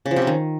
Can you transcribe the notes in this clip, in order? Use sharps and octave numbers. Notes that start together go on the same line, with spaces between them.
C#3
F3
C3
C#3
D#3